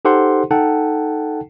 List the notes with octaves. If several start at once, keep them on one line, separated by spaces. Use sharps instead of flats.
D#4 G4 A4 C5 F#5 C6
D#4 A4 F#5 G5 A5